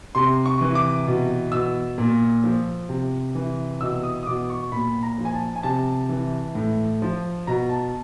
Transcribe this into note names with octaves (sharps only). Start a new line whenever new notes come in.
C3 C6
C#6
E3
D6
B2
B2 E6
A#2
F3
C3
E3
B2 E6
D#6
D#6
B2 D6
C#6
A#2 B5
A#5
F3
G#5
A5
G#5
C3 A5
E3
A2
F3
B2 A#5
A5